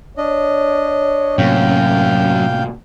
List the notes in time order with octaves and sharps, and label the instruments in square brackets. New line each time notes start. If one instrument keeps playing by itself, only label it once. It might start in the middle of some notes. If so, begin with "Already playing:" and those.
[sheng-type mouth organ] D4 D#5 [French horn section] C#5
[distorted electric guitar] F#2 [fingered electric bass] A2 C3 A#3 [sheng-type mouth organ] F5 G5